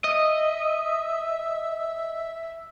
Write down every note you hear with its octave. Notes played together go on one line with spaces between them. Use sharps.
D#5 E5